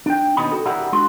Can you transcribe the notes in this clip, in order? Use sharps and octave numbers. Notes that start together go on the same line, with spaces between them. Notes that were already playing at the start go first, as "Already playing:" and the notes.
D4 G5
D#2 B2 C#4 D#5 B5
F#4 A4
E4 G4 G#4 A#4 D5 F#5
G#3 D4 F#4 C6